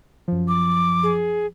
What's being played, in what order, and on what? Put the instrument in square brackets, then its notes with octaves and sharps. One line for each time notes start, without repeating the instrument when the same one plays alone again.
[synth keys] F#2 F3
[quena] D6
[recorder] G#4